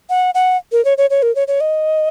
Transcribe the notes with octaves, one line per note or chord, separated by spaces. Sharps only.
F#5
F#5
A#4
C#5
C#5
C#5
A#4
C#5
C#5
D#5